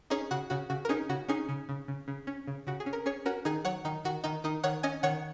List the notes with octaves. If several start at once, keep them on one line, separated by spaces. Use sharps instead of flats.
C#4 D#4 G#4
C#3 F#4
C#3 F#4
C#3 F#4
A#4
C#4 D#4 G#4
C#3 F#4
C#4 D#4 G#4
C#3
C#3
C#3
C#3
C#4
C#3
C#3 F#4
G#4
C#4
A#4
C#4 G#4 C#5
C#4 F#4 A#4
D#3 D#4 G#4
F#3 C#5 F#5
D#3 D#4
D#3 F#4
D#3 D#4
D#3 D#4
D#3 C#5 F#5
C#4 D#5 G#5
D#3 C#5 F#5